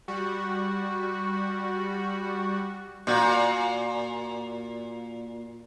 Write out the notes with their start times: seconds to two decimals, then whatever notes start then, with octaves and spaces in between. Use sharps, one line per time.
0.08 G3 F#4
3.07 A#2 F#4